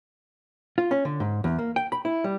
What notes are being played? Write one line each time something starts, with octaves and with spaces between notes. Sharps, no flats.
F4
C#4
D3
G#2
E2
A#3
G5
B5
E4
G3